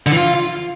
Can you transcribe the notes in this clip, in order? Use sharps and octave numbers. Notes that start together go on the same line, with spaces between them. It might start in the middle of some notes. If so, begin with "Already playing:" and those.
D3
E3
F4